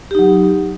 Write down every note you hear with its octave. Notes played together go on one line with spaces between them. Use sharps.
F#3 D#4 G4